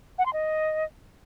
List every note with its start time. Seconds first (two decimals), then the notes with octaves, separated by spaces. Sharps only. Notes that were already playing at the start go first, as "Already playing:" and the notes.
0.18 F#5
0.26 C6
0.33 D#5